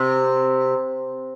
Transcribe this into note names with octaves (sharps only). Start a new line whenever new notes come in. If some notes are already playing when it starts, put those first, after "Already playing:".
Already playing: C3